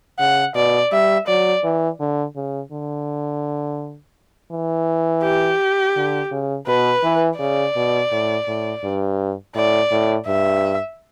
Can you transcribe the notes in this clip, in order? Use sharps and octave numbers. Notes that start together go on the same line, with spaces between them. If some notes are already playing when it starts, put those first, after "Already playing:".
C#3 F#5
B2 D5
G3 E5
F#3 D5
E3
D3
C#3
D3
E3
G4
D3
C#3
B2 B4
E3
C#3 D5
B2
A2
A2
G2
A2 D5
A2
G2 E5